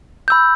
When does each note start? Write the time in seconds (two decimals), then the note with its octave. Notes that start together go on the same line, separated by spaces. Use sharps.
0.28 B5 E6 G6